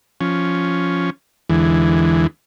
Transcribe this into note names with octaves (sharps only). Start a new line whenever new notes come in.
F3 C#4
E2 D3 E3 G#3